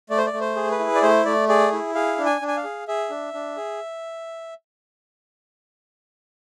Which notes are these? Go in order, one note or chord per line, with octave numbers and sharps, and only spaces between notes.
A3 D5
C5
D5
A3
C5
G#4
B4
E4
D5
A3 C5
A3 D5
G#4 D5
E4
G#4 F5
D4
G#5
D4
G#5
F5
G#4
G#4 E5
D4
D4
G#4